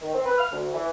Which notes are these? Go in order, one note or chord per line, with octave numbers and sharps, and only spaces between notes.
D#3
C4
B4
F6
D2
E3